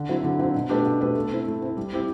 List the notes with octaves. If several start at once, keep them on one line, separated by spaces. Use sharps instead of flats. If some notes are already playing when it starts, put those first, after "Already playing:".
Already playing: D3
F#3 C4 E4
D3
F#3 C4 E4
B2
A3 D4 G4 B4
B2
A3 D4 G4 B4
A3
C4 E4
A3
C4 E4
G3
C4 E4 G4